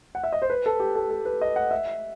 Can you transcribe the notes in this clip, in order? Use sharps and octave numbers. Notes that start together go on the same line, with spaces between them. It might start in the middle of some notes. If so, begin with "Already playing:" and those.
F#5
E5
D#5
C5
B4
A4
G4
A4
A4
B4
D#5
F#5
E5